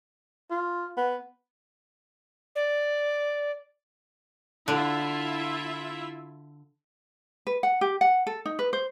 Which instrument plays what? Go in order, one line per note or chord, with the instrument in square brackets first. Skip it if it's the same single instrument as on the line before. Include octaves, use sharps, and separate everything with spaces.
[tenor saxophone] F4
B3
[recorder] D5
[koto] D3 [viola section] E4 F4 E5
[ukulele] B4
F#5
G4
F#5
A4
D#4
B4
C5